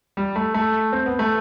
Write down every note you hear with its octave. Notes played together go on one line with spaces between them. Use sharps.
G3
A3
A3
C4
B3
A3